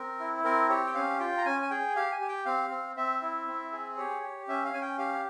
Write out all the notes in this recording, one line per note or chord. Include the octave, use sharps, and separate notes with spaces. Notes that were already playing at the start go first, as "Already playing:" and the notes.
Already playing: C4 A#4
E4
C4 A#4
G4 C#5
G5
C#4 F5
F4 G5
A#5
C#4 G#5
G#5
G#4 G5
G4 F5
G#5
G4
G5
C4 F5
C4
C4 E5
E4
C4
G#4
G4 C#5
G4
C#4 E5
F5
C#4 G#5
G5
G4 F5